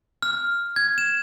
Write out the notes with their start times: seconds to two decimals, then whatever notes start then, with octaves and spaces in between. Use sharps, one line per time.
0.22 F6
0.76 G#6
0.98 E7